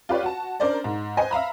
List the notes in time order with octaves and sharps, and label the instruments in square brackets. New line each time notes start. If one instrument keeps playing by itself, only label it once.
[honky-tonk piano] F4 G4 B4 C#5 D5
F#4 A5
C#4 D4 A#4 C5 D5
G#2
B4 C5 D#5 G#5
E5 F5 A#5 B5